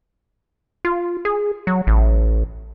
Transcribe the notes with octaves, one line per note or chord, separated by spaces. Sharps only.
F4
G#4
F#3
A1